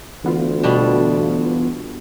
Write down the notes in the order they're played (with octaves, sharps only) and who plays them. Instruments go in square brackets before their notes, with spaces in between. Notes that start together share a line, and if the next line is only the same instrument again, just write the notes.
[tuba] D2 [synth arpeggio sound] E3 B3 F4
[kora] B2 G3 D4